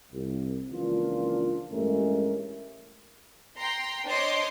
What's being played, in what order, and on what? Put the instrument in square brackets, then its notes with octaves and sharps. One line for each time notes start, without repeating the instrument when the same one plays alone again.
[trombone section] C2
C#2 E3 F3 A#3 D4 F4
A1 G2 G#3 A3 C#4 A#4
[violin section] G5 A#5 C6
D4 C5 C#5 D#5 C6 D6